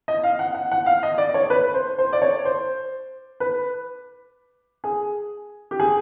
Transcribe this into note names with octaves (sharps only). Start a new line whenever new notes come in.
D#5
F5
F#5
F#5
F#5
F5
D#5
D5
C#5
B4
C5
C5
D5
C#5
C5
B4
G#4
G4
G#4